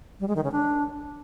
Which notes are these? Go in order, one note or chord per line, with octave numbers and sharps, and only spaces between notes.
G3
G#3
D#3
C#3
D4